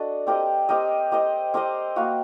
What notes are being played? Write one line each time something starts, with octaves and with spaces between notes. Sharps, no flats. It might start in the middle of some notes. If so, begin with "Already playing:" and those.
Already playing: D4 F#4 A4 D#5
C4 G4 A#4 D#5
C4 G4 A#4 D#5
C4 G4 A#4 D#5
C4 G4 A#4 D#5
A#3 F#4 A#4